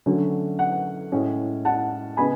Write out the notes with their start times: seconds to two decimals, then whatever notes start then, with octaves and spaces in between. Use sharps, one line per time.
0.06 D3 F#3 A3 C#4
0.59 F#5
1.12 A2 G#3 C#4
1.65 F#5 A5
2.17 C#3 G#3 B3 G#5 B5